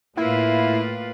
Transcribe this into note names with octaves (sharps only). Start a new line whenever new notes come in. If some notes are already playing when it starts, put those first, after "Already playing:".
A2 A#3 E4 F4 B4